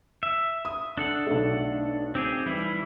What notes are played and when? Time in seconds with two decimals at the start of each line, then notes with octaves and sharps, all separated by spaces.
0.23 E5
0.65 D#6
0.97 D4 A4 F#5
1.27 B1 A3
2.15 C4 G4 G#4
2.46 E3 G3 E4